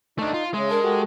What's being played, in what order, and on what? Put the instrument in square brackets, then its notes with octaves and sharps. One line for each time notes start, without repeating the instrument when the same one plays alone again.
[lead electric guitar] A3 D4 [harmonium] D#4
[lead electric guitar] F4
[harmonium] C#3 E5 [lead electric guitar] G#3
[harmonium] D4 A5 [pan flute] A#4
[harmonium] F#4 G4 A4